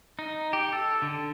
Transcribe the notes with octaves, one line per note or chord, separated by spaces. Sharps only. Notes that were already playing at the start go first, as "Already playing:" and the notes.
D#4
G4
A4
D3